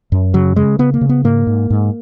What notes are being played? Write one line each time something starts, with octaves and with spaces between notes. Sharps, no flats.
F#2
C#3 F#3
C#3 G#3
C#3 B3
A#3
C#3
B3
G#2 A#3
G#2
G#2